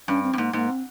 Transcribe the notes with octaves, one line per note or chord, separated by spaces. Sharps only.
G2 C#4
C4
G2
G#2 A#3
G#2 A#3
C4